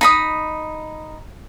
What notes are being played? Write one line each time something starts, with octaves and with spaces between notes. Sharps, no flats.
D#4 B5 D#6